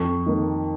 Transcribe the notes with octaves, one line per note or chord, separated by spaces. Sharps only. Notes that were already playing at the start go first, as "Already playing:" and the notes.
Already playing: F2 C#6
D#3 A#3